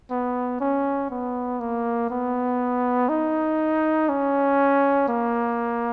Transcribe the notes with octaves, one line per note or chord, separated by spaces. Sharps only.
B3
C#4
B3
A#3
B3
D#4
C#4
A#3